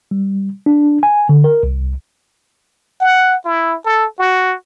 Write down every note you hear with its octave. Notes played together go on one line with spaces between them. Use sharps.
G3
D4
G#5
D3
A#4
C2
F#5
E4
A4
F#4